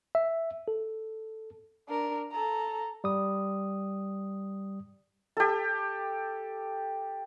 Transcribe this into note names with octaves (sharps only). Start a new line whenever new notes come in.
E5
A4
D4 A#4
A4 A#5
G3 D#6
G4 A4